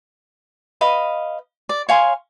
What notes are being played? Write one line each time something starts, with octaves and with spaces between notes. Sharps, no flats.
B4 D#5 F5
D5
C#5 F5 G#5 C6